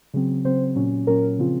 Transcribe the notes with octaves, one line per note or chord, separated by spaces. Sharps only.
C#3 F#3 C4
C#3 F#3 C4 C5
A#2 F#3 C#4
A#2 F#3 C#4 A#4
C#3 F3 C4 F4